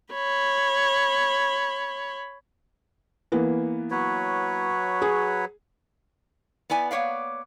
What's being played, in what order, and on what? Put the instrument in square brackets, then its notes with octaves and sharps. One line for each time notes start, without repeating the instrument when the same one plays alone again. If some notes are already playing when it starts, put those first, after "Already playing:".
[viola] C#5 B5
[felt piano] E3 A#3 B3
[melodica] F#3 B4 C#5
[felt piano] G#4
[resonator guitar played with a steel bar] B3 E4 D5 G#5
A#3 B3 C#5 D5 F5